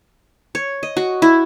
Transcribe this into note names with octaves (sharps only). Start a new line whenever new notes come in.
C#5
D#5
F#4
E4